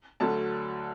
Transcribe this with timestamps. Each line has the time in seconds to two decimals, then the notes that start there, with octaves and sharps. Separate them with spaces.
0.20 D2 D3 F#3 A3 A5